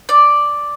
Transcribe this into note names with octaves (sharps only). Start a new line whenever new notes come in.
D5